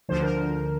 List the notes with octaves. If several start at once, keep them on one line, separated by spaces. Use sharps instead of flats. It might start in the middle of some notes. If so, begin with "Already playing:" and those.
D2 D3 F3 C5
A#4